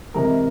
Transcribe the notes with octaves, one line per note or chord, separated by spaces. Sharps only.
C3 E3 G#3 A#4